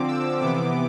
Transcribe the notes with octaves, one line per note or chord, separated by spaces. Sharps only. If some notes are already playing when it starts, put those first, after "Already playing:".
Already playing: D3 F3 C4 D6
E6
C3 E3 B3 D6